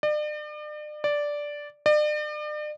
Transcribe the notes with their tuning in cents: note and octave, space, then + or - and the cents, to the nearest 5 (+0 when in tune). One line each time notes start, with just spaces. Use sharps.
D5 +40
D5 -5
D5 +40